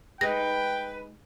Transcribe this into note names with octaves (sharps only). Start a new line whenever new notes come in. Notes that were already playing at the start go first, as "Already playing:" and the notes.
G#3 D#4 B4 G5 A#6